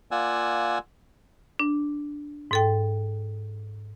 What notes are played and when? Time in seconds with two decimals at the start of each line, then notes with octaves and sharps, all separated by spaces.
0.11 A#3 F4 D5 F#5 G#5 E6
1.59 D4
2.51 G#2 A4 G5